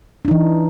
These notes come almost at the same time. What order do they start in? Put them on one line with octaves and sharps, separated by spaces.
D4 D#4 E3